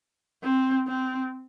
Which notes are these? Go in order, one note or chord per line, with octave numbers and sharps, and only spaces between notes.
C4
C4